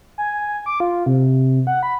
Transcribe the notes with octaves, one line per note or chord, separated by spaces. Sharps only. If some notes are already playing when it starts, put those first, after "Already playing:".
G#5
D6
F4
C3
F#5
B5